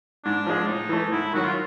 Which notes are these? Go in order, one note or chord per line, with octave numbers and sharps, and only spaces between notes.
G#2 D4
F3 G#3
A2 D#4
E3 A3
G#2 E4
D#3 F#3 F#4
F4